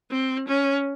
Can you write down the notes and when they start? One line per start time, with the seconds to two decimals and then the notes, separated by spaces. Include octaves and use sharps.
0.11 C4
0.48 C#4